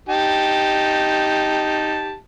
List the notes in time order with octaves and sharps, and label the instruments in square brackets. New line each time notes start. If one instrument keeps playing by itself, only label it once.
[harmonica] D#4 G4 A5